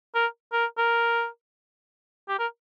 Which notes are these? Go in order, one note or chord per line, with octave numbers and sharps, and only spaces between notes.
A#4
A#4
A#4
G4
A#4